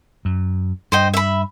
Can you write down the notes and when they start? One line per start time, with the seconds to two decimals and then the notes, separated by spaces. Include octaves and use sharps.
0.25 F#2
0.92 G2 C5 D#5 G5
1.14 E5 B5